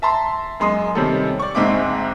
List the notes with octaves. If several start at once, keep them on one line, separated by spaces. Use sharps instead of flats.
E5 A5 A#5 C6
F#2 G#3 C6 D#6
C3 D#3 G3 C4 C#4 A4
D5 C#6
D2 G#2 G#3 C4 E5 D6